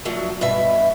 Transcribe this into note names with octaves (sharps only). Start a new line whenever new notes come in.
F3 F#3 A3 D4
G2 B2 E5